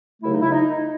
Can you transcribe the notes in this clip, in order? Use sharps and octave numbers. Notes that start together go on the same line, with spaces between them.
D#2 C#3 F#3 A3 E4
D#4
E4
D#4